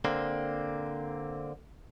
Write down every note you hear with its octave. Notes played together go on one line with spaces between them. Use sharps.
D3 A#3 C4